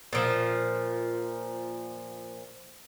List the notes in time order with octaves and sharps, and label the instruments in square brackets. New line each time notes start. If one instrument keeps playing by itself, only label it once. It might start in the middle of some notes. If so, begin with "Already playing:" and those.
[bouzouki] A#2 F3